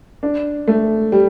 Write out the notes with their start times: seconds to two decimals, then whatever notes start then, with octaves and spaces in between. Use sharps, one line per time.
0.23 D4
0.68 A3
1.12 G3